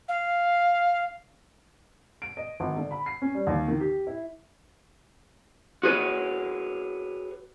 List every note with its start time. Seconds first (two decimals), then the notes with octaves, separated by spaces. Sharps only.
0.08 F5
2.22 D7
2.37 D#5
2.60 G#1
2.76 D3
2.91 B5
3.06 C7
3.22 C#4
3.34 G3
3.47 D#2
3.68 D#3
3.80 G4
4.07 E4
5.83 F#4 G#4 B4 C#5